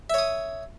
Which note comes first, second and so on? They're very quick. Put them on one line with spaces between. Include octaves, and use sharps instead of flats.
E5 C#5 D#6